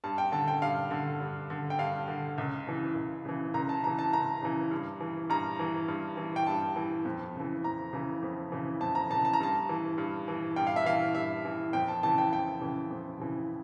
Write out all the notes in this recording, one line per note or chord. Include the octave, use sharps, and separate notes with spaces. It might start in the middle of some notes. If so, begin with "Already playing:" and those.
G2 A5
G5
D3 A5
G5
G2 F5
D3
G2
D3
G5
G2 F5
D3
C#2
C#3 E3
C#2
C#3 E3
C#2 A#5
A5
C#3 E3 A#5
A5
C#2 A#5
C#3 E3
G2
E3
G2 A#5
E3
G2
E3
G5
G2 A5
E3
F2
C#3 E3
F2 A#5
C#3 E3
F2
C#3 E3
F2 A5
A#5
C#3 E3 A5
A5
A#5
G2 A5
E3
G2
E3
G2 G5
F5
E5
E3 F5
G2 E5
E3
F2 G5
A5
C#3 E3 A5
G5
F2 G5
C#3 E3
F2
C#3 E3